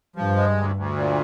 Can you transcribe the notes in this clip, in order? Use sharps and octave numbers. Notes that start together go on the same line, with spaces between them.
G2 F3
G#3
D2
D2
A#2